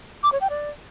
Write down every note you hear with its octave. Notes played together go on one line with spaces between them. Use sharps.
D6
C#5
G5
D5